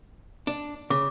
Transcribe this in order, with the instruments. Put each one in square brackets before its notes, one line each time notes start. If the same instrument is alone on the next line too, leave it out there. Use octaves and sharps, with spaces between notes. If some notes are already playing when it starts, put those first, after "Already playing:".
[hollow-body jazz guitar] D4
[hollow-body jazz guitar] C#3 [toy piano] D6